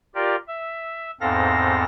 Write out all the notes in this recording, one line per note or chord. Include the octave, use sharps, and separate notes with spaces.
F4 G4 A#4 D5
E5
E2 G#2 C4 A4 F5 A#6